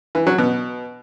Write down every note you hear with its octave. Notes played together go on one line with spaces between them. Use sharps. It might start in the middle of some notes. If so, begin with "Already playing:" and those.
E3
F#3
B2